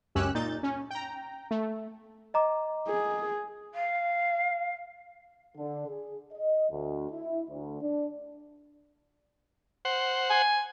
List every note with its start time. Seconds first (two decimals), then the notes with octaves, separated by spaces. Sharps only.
0.15 C#2 F#2 C#4 G4 E6 F#6
0.35 A#2 D#4 G6 A6
0.63 C#4
0.91 G5 A#5
1.51 A3
2.34 D#5 A#5 D6
2.88 G#4
3.73 F5
5.57 D3
5.88 G#4
6.33 D#5
6.71 D2
7.11 E4
7.50 D2
7.82 D4
9.85 C5 F#5
10.30 G#5